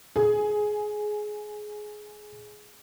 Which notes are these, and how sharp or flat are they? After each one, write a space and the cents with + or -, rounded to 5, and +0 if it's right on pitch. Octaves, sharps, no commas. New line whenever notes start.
G#4 +10